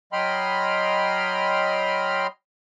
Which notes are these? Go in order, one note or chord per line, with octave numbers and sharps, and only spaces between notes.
F#3 D#5 G5 B5 C6 F6